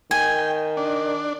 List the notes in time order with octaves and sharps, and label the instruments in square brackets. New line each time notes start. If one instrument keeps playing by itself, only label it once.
[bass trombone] D#3 [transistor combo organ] G5 [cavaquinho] G#5
[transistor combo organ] D4